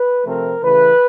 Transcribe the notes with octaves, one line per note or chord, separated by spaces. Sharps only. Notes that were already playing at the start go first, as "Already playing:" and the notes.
Already playing: B4
C3 F3 A3 C4 A#4
C#3 E3 A3 B4